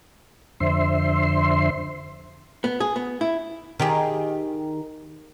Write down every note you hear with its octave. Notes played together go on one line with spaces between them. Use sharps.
F2 D3 C5 E5 C6
B3
G#4
B3
E4
D#3 G4 G#4